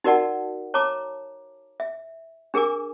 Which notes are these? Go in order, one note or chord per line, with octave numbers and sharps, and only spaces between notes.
D#4 F#4 A#4 D5 F#5 A5
C#5 A5 A#5 D6
E5
D4 G#4 A#4 G#5 D6